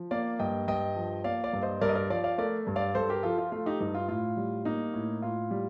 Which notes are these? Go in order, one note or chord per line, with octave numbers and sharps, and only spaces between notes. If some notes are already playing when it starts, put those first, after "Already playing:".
Already playing: F3
A#3 D5 F5
G2 D#5 G5
G2 D#5 G5
F3
A#3 D5 F5
D5 F5
G2
C5 D#5
G2 A#4 D5
D#5
A#4 D5
F3 D5 F5
D5 F5
A3 A#4 D5
G2
D5 F5
G2 A4 C5
G4 A#4
F3 F4 A4
F4
A3 F4
D#4 G4
G2 D#4
F4
A2 F4
G3
A#3 D#4
A2
A2 F4
G3